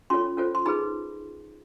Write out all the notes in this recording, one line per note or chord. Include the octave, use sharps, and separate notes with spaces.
C#4 F4 A4 C#5 C6
C#4 F4 A4 C5
C6
D#4 G#4 B4 B5